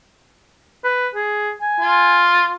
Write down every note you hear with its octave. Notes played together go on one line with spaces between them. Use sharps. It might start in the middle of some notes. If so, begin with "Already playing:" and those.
B4
G#4
G#5
F4